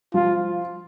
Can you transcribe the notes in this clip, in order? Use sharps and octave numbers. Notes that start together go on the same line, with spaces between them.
F3 F4